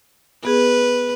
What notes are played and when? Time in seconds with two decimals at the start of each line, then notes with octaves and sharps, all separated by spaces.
0.45 B3 G#4 B4